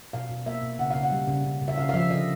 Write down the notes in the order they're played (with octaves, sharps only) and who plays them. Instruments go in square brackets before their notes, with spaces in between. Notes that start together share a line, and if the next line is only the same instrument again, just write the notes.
[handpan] B2 F5
B2
A#3 E5
B2
C#3 F#5
C#3 F5
F#5
G3
C#3
C#3
C#3
E5
C#3 F5
F5
F3 E5
D3 D#5